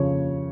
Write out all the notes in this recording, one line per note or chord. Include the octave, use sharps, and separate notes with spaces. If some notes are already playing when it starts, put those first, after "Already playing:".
Already playing: C#3 F3 C#5